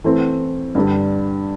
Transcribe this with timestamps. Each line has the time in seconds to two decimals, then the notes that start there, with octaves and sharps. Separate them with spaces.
0.04 E3 A3 C4
0.75 G2 D3 G3